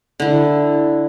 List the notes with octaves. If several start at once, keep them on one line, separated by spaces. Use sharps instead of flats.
D3 E4